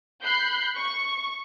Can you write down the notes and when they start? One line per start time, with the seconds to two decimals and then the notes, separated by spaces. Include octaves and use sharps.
0.22 B5 F#6 G6 C7
0.77 C#6